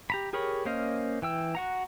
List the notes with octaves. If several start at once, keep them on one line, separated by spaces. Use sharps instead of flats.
G4 A#5 B5
G4 G#4 A#4 C#5 B5
A#3 C#4 C5 D#5 F5
E3 G5 E6
F#4 F#5 A#5